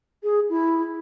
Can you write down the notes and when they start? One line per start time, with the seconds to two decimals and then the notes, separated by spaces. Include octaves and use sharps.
0.23 G#4
0.49 E4